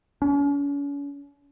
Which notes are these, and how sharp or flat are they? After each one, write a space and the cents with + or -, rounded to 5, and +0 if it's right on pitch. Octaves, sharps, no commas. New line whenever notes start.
C#4 +40